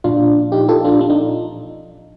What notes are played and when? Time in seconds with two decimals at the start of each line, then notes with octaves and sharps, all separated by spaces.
0.04 A#2 F3 D4 F4
0.52 D#4 G4
0.68 F4 A4
0.84 D4 F4
1.01 D4
1.10 D#4